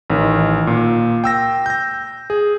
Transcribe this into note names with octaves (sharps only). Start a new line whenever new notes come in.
A1 D#3
A#2
G5 E6 A#6
G6 A#6
G#4